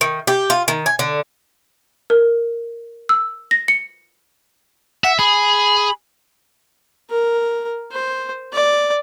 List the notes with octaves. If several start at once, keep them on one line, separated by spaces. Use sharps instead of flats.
D#3
G4
F4
D#3
G#5
D3
A#4
E6
A#6
C#7
E5 F#5
G#4 B5
A#4
C5
D5